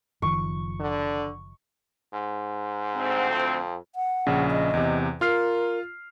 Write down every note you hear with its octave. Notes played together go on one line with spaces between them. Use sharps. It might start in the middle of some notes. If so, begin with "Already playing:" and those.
F#1 D#3 F3 C#6
D3
G#2
D2 C4
F2
F#5
A#1 C#3
D#5
E2 C3
F4 A#4 F6 C7